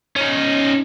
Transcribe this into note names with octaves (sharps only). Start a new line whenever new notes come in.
C#4 D#4